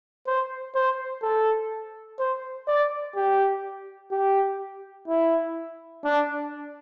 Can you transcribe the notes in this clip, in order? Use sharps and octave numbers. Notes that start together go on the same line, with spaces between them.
C5
C5
A4
C5
D5
G4
G4
E4
D4